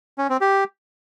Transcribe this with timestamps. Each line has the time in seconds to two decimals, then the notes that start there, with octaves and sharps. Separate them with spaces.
0.18 C#4
0.29 C4
0.41 G4